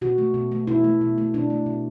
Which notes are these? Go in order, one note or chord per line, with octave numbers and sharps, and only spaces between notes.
B2 F#4
A3
B2
A3
B2 E4
A3
B2
A3
B2 D4
A3
B2